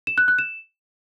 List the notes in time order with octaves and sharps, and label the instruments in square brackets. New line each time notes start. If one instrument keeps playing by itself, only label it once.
[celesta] E7
F#6
F#6
E7